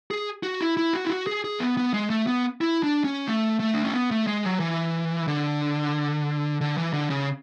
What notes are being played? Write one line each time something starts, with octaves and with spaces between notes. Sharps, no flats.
G#4
F#4
E4
E4
F#4
E4
F#4
G#4
G#4
B3
B3
G#3
A3
B3
E4
D4
C#4
A3
A3
D4
C#4
B3
A3
G#3
F#3
E3
D3
D3
E3
D3
C#3